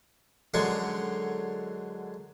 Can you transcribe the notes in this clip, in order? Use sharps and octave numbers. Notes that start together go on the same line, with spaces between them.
F#2 D3 F#3 G#3 C6 C#6